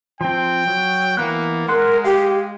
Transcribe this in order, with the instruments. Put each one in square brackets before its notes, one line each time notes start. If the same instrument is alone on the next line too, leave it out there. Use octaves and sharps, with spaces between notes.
[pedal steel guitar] F3 C4 [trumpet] G5
[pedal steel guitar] F#3
[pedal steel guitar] E3 B3 F#6 [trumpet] A#3
[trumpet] G#3 [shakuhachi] A#4 [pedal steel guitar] F#5 C6 F#6
[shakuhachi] G4 [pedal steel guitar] F5